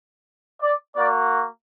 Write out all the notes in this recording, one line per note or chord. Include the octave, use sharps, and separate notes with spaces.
D5
A#3 F#4 D5